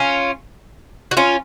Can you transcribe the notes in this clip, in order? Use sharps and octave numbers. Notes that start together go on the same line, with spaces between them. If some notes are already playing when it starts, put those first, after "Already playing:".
Already playing: C#4 F4
F#4
C#4 F4